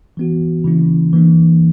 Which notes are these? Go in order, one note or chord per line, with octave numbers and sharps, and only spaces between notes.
E3 B3 F#4
C#3 E3 A#3 C#4 E4
E3 A#3 D4